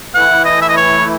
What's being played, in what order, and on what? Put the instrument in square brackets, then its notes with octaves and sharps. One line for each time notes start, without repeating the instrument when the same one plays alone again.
[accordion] E3 A3 E4 [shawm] F#5
[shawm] D#5
E5
D#5
C#5